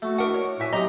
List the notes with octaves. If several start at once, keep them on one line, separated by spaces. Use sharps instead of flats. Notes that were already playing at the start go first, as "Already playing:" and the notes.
A3 F#4
D4 E4 A#4 D#5 F#5
C#5
A2 F#4 E5 G#5
F#3 C4 G4 D#5 A#5 D#6